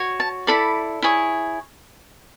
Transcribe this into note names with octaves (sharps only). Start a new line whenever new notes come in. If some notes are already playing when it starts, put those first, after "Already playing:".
Already playing: F#4 C#5
A5
E4 A4 D5 B5
E4 G#4 C#5